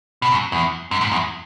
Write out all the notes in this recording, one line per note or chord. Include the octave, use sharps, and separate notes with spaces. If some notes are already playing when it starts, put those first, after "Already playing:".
B2
F#2
E2
F#2
G#2
E2